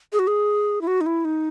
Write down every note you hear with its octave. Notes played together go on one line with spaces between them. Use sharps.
G#4
F#4
G#4
E4
F#4
D#4
E4
D#4